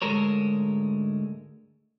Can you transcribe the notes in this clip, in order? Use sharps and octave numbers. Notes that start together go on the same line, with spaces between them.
D2 G#2 G#3 A4 A#4 C#5